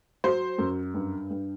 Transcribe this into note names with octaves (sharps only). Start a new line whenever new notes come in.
F#3 C5
F#2
G2
G2